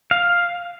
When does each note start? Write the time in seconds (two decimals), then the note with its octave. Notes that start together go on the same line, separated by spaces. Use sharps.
0.11 F5